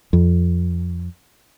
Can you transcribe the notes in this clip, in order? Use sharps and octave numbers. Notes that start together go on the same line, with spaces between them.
F2